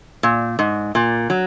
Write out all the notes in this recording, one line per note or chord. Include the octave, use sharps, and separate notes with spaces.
A#2
G#2
A#2
F#3